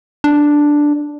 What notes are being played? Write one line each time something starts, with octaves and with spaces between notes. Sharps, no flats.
D4